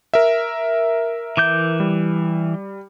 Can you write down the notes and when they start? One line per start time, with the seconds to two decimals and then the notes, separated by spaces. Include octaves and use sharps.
0.14 A#4 E5
1.37 E3 D6 G6
1.80 G3